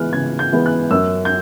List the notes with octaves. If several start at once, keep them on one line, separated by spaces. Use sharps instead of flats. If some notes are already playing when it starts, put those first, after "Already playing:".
Already playing: C#3 E3 G#3 B3 F6 F#6
C#3 G#6
G6
E3 G#3 B3
F#6
F#2 E6
G6